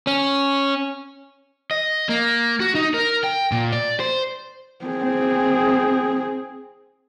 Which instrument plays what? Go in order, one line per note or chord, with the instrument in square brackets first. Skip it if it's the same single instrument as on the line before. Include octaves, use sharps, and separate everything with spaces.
[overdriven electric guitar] C#4
D#5
A#3
F#4
D#4
A#4
G5
A#2
D5
C5
[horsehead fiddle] C4 G#4